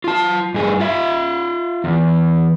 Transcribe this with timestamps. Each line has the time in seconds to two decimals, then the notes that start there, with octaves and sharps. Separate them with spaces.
0.04 F4 A5
0.54 G2 G#4
0.80 F4 E5
1.84 E2